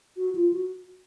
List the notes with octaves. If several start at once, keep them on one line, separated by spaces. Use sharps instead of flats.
F#4
F4
F#4